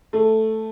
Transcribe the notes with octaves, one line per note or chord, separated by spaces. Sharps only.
A3